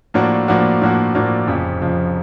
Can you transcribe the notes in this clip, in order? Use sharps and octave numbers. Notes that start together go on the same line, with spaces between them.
A2 F3 A#3 D4 F#4
A2 F3 A#3 D4 F#4
A2 F3 A#3 D4 F#4
A2 F3 A#3 D4 F#4
F1 F2 C#3 F3
F1 F2 C#3 F3